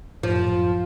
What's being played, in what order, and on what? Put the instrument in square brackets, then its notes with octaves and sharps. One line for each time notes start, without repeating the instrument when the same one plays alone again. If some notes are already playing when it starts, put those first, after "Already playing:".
[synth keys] F#2 A2 [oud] F3